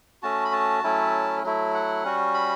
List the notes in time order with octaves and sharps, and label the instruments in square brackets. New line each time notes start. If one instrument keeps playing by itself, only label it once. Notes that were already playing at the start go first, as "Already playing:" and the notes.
[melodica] A3 C#4 F#4 A5
B5
A5
F#3 A3 C#4 E4
F#3 A3 E4
F#5
G3 C#4 F#4
B5